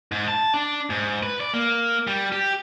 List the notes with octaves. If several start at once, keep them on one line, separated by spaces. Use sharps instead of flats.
G#2
A5
D4
G#2
B4
D5
A#3
G3
G4